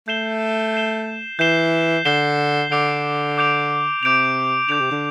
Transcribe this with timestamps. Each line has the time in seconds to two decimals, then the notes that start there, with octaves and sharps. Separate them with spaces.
0.08 A3 G6 C7 E7 G7
0.74 G6 C7 E7 G7
1.39 E3 G6 C7 E7 G7
2.05 D3 G6 C7 E7 G7
2.71 D3 D6 G6 D7 F7
3.38 D6 G6 D7 F7
4.03 C3 D6 G6 D7 F7
4.69 D3 D6 G6 D7 F7
4.80 C3
4.91 D3